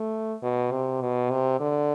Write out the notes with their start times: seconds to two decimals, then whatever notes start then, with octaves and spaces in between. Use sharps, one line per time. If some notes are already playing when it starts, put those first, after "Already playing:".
Already playing: A3
0.43 B2
0.71 C3
1.01 B2
1.31 C3
1.60 D3